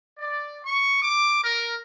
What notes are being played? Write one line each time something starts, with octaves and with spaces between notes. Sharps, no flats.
D5
C#6
D6
A#4